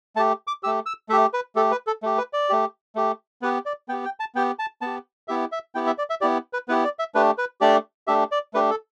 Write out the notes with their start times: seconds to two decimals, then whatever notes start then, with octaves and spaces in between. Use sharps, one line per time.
0.16 A3 A5
0.19 G4
0.47 D6
0.63 G4 E6
0.66 A3
0.86 E6
1.09 A3 E5
1.12 G4
1.33 B4
1.55 A3 G4 A4
1.71 B4
1.87 A4
2.03 A3 G4
2.18 B4
2.33 D5
2.49 A3 G4
2.96 A3 G4
3.42 B3 G4 B4
3.66 D5
3.88 B3 G5
3.93 G4
4.05 G5
4.20 A5
4.35 B3 G4 G5
4.59 A5
4.81 B3 G4 A5
5.28 B3 E4 G4 E5
5.52 E5
5.75 B3 E4 G4 G5
5.87 E5
5.98 D5
6.10 E5
6.21 B3 E4 G4 D5
6.53 B4
6.68 B3 E4 G4 B4
6.84 D5
6.99 E5
7.15 A3 D4 G4 B4
7.38 B4
7.61 A3 D4 G4 D5
8.07 A3 D4 G4 E5
8.32 D5
8.54 A3 D4 G4 B4
8.70 A4